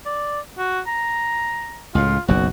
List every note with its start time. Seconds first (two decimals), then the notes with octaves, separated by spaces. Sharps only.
0.06 D5
0.58 F#4
0.87 A#5
1.95 C#2 A2 F4
2.28 F#1 B1 F#2 F#4